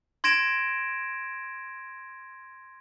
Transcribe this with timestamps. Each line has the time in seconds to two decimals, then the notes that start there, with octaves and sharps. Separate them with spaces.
0.24 C6 G#6 A#6 D7 E7